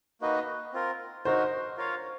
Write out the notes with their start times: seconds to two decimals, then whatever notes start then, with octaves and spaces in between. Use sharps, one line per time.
0.21 A#3 D#4 F#4 B4 D#5
0.73 C4 F4 A#4
1.25 D#4 F#4 A#4 C5
1.77 F4 A#4 C#5 F5